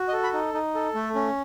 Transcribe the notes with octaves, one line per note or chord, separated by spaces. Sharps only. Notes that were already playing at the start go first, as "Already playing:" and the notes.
Already playing: F#4
D#5
A4
B5
D#4
D#4
A4
A3
C#4